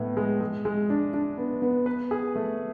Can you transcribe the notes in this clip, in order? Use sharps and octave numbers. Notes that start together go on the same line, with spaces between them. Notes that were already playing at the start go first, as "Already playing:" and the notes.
Already playing: A2 B3
G#3
G#3
G#3
D4
D4
B3
B3
B4
G#4
A3